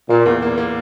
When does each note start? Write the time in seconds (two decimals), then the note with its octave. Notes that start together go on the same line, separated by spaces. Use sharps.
0.10 A#2 A#3
0.26 E2
0.42 A#3
0.58 A#3